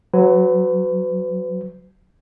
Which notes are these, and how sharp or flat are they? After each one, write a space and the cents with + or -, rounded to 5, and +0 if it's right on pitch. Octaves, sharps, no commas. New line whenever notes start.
F#3 +0 B4 +35